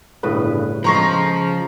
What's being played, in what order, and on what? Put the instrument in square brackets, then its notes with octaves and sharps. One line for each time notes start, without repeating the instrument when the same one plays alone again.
[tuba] G1 [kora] A2 C#3 B4
[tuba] C#3 [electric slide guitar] F3 [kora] G#3 C5 [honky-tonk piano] A#5 C#6 A#6